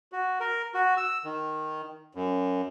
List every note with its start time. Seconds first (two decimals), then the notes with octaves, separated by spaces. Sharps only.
0.12 F#4
0.40 A#4
0.74 F#4
0.97 E6
1.24 D#3
2.15 F#2